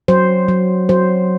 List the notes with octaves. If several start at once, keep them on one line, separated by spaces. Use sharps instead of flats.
F#3 C5
F#3
F#3 C5